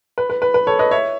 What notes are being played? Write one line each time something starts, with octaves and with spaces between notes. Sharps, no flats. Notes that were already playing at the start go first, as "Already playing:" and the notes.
B4
B4
B4
B4
A4 C#5
B4 D#5
C#5 E5